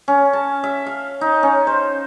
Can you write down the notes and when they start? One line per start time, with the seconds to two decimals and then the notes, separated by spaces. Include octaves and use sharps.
0.08 C#4
0.33 A5
0.64 E5
0.86 F5
1.21 D#4
1.43 C#4
1.67 C5